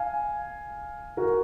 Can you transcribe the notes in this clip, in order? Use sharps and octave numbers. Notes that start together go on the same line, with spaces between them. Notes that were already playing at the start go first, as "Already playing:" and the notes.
Already playing: F5 G#5
F#4 A#4